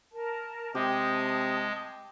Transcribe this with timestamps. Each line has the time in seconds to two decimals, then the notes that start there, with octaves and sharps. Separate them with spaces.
0.13 A#4 A5
0.75 C3 G#3 G4 A5 D#6